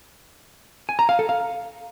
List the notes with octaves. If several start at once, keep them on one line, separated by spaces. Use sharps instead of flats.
G#5
A#5
F5
A4
F5